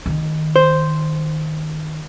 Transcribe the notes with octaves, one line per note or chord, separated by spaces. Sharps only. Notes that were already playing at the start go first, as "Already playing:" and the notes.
D#3
C5